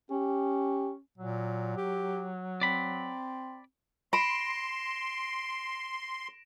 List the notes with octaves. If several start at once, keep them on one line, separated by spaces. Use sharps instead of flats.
C#4 G4
A#2 F#3
G4
C4 D5 B5
B5 C6 A#6 D7 E7